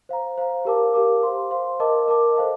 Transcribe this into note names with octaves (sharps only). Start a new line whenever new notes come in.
C5 F5 A#5
C5 F5 A#5
G4 A#4 F5 A5 D6
G4 A#4 F5 A5 D6
C5 F5 C6
C5 F5 C6
A#4 D#5 A5 D6
A#4 D#5 A5 D6
A4 C5 F5 A5